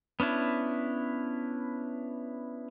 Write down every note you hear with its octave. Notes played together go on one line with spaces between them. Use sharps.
B3 C#4 D4 E4